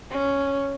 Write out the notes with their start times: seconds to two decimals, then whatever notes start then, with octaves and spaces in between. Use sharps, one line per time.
0.10 C#4